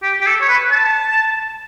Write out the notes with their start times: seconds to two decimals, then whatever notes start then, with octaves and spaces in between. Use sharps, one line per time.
0.03 G4
0.21 G4
0.26 A4
0.41 C#5
0.49 B4
0.71 A5